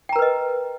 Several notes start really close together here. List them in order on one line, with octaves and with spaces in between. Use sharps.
G5 A#5 A#4 B4 D#5